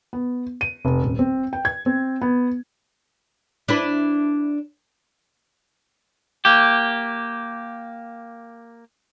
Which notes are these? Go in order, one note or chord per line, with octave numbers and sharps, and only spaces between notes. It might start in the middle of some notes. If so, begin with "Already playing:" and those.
B3
D#7
F1
D#1
C4
G5
G#6
C4
B3
D4 E4 B4
A#3 G4